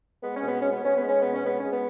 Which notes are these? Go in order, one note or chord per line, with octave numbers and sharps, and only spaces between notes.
G#3 B3
C#4
B2 B3
G#3 C#4
B3
G#3 C#4
B3
G#3
C#4
B2 B3
C#4
G#3 B3
G#3 C#4
B3